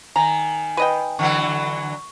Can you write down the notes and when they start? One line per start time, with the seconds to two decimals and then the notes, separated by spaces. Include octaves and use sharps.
0.16 D#3 G#5 A#5
0.77 B4 D#5 G5
1.19 D3 E3 F#3 C#6